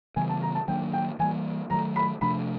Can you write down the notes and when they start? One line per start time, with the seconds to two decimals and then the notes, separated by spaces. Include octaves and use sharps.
0.16 C#3 E3 G3 B3 G#5
0.29 A5
0.42 A#5
0.55 A5
0.68 D#3 F#3 A#3 D4 G5
0.93 G5
1.19 E3 G3 A#3 G#5
1.70 D#3 F#3 A3 A#5
1.96 B5
2.21 C3 F3 A3 D4 B5